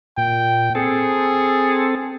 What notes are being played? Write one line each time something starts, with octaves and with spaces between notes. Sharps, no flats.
A#2 G5
C4 G#4 A4